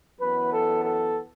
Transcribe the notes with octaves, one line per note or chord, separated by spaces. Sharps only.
F#2 E3 B3 B4
A4
A4